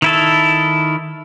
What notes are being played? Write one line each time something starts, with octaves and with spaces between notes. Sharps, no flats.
D#3 E4 A4